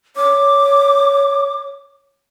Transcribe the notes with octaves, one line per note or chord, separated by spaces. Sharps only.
C#5 D6